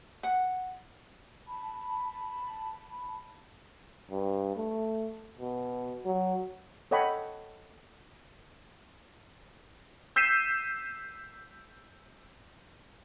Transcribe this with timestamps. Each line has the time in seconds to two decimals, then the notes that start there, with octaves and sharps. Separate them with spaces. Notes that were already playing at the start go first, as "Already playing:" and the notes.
0.23 F#5
1.47 A5 B5
4.11 G2
4.56 A3
5.39 B2
6.05 F#3
6.91 A4 C#5 D#5 F#5 G5 B5
10.16 E6 G6 B6 C7 D#7 E7